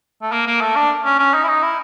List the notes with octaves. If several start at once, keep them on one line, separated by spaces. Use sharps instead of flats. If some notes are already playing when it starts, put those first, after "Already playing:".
A3
A#3
A#3
A3
D4
C#4
C#4
D#4
E4
D#4
E4